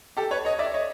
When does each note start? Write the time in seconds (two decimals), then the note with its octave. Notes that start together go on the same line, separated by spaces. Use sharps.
0.17 G4 A4
0.31 B4 C#5
0.45 C#5 D#5
0.59 D5 E5
0.74 C#5 D#5